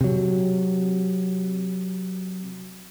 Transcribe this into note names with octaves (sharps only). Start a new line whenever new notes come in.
C3 F#3